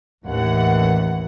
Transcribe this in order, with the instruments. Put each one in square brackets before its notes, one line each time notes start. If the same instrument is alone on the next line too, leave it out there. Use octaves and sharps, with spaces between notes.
[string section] A1 D#2 E3 F#5